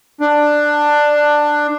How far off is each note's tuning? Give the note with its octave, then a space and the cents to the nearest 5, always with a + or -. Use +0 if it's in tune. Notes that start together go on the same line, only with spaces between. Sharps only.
D4 +10